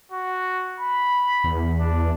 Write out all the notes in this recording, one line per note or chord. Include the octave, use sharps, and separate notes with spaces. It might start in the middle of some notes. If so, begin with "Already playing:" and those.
F#4
B5
E2
D4